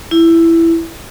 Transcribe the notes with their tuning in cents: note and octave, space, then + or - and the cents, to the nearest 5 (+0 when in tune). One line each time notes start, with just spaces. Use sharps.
E4 +10